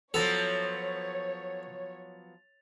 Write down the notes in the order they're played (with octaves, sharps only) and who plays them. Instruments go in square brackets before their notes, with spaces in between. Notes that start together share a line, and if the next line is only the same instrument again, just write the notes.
[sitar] F3 F#3 B3 [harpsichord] A4 [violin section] C#5 [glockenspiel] A6 F7